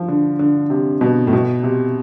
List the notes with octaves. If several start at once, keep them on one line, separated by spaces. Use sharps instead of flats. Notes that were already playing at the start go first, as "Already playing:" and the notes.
Already playing: F3
D3
D3
C3
B2
A2
B2
C3